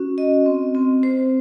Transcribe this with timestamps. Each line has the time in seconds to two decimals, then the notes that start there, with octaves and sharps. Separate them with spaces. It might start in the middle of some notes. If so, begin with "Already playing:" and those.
Already playing: C#4 F#4
0.18 D#5
0.46 C4
0.75 C4
1.03 C5